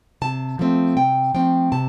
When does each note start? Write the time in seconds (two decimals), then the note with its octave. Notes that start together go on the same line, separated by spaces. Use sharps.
0.22 C3 A5
0.59 F3 A3 C4
0.97 C3 G5
1.34 F3 A3 C4 G5
1.72 C3 A5